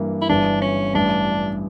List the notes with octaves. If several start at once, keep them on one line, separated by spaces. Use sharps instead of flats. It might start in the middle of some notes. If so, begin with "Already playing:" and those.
Already playing: G2 E3 A#3
E4
G1 G2 E3 D4
C#4
A1 G2 E3 D4